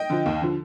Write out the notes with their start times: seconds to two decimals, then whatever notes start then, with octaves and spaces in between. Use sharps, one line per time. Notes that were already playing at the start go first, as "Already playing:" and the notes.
Already playing: D#5 G5
0.10 D3 F3
0.26 D#2
0.42 D3 F3